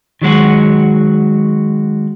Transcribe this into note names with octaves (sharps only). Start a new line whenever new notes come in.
D#3 F#3 G#3 F#4